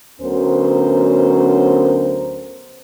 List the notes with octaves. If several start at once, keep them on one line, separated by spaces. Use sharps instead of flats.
D2 F#3 B3 C#4 A#4 C5